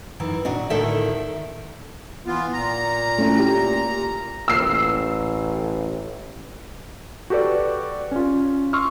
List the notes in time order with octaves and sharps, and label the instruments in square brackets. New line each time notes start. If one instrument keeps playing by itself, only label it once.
[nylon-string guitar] F#2 D#3 E3
A#2 D4 F#4 D#5
D2 A2 D3 D#3 A4 E5
[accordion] E3 B3 F4
A#2 A#5
[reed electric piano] A3 C#4 E4
G4
[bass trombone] A1 [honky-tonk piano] E6 C7
[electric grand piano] F#4 G4 A4 B4 D5
C#4 F4
C6 C#6 E6 F6